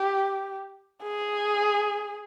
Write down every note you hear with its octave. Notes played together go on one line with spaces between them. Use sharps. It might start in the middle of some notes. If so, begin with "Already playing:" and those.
Already playing: G4
G#4